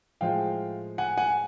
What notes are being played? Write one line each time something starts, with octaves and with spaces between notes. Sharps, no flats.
A2 F3 G#3 F5 G5
F#5 G#5
F#5 G#5